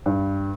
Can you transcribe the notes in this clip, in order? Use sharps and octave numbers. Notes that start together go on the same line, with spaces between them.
G2